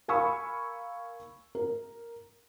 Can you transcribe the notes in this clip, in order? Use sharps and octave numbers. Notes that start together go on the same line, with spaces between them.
A#4 F5 G#5 B5 C#6 E6
A#4